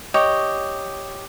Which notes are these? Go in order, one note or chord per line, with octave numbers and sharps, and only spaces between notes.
G4 C#5 D#5 D6